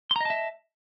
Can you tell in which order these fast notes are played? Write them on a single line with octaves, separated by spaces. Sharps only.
C6 A#5 D#5 A5 E5